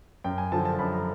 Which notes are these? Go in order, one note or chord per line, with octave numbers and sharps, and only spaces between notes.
F#2 G5
G#5
D3 F3 A5
A5
F#2 B5
A#5